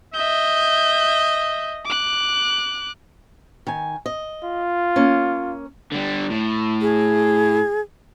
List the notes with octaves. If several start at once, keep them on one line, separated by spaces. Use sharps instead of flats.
D#5 E5 G6
D6 F#6
D#3 G#5
D#5
F4
A#3 C#4
D3 G3
A2
G#4